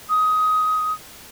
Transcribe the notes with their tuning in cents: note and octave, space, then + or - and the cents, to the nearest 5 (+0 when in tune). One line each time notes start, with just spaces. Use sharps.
D#6 +15